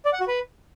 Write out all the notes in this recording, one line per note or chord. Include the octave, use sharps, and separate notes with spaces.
D5
F#5
F#4
B4